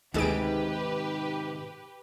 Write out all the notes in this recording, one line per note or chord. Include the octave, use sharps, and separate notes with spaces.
D2 G#2 C3 D#3 G4 G#4 B4 D7